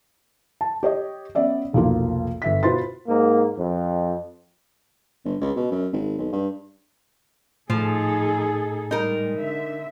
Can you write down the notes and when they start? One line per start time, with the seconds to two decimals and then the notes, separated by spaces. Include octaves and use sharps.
0.61 A5
0.83 G4 C#5 D#5
1.35 B3 C#4 D5 E5
1.73 F1 B1 F3 A#3 F4
2.42 G1 E5 B6
2.63 B2 F4 B4 C5 C6 A6
3.07 G#2 A#3
3.59 F2
5.25 G1
5.41 C#2
5.56 B2
5.71 F#2
5.93 G#1
6.18 B1
6.33 G2
7.70 A2 F3 D#4 G#4 A4
8.91 G3 G#3 D#4 A#4
9.38 D3 E5